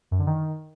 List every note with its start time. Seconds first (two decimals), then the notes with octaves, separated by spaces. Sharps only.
0.11 F#2
0.19 D3
0.27 D#3